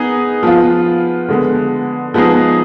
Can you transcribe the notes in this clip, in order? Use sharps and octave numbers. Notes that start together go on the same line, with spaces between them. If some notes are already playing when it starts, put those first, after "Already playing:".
Already playing: B3 D#4 G#4
F3 B3 F4
D3 G#3 B3
F3 G#3 B3 D#4 G#4